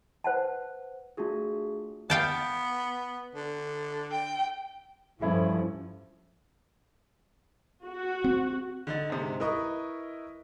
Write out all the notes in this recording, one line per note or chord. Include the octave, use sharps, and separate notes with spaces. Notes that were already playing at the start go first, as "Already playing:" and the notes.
B4 C5 F#5 A5
A3 D4 F4 F#4 G#4
B3 F5 G5 A5
D3
G5
G2 F3 C#4 E4 A4
F#4
C4
D3 D#4 A6
G#2 C3
E4 A#4 B4 D#5 C#6 D#6